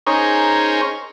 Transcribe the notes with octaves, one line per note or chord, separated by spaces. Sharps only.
C#4 D#4 G#4 A#4 C5 C#5